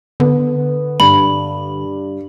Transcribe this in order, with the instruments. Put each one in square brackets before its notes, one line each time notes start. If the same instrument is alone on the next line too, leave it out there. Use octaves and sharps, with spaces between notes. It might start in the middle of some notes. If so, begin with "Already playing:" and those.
[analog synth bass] D3 [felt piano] B3
[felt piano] G2 [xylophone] B5